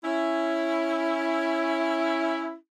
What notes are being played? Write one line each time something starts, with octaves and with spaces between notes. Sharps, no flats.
C#4 E4